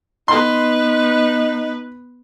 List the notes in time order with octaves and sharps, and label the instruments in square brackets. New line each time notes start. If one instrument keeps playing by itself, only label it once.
[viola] B3 B4 [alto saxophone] D#4 [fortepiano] C6